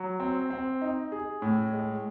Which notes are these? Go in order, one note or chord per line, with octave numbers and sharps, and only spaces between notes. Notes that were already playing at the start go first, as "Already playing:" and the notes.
Already playing: F#3
C4
C4
D#4
G#4
A2
G#3